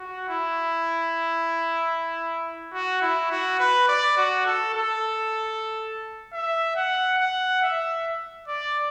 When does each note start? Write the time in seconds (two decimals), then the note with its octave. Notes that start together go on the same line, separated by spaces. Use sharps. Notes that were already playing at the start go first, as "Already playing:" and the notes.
Already playing: F#4
0.29 E4
2.74 F#4
3.02 E4
3.31 F#4
3.59 B4
3.88 D5
4.17 F#4
4.46 A4
4.74 A4
6.33 E5
6.76 F#5
7.19 F#5
7.62 E5
8.48 D5